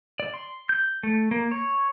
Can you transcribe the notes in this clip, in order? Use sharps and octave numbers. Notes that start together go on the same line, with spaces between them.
D5
C6
G6
A3
A#3
C#5